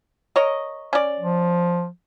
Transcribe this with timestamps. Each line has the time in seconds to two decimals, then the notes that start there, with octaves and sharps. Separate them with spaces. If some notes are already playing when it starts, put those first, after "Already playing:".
0.36 A#4 C#5 D#5
0.93 C#4 D5
1.20 F3